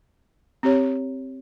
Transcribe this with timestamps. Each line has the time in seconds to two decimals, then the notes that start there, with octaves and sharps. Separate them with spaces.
0.63 C4 G4 C#5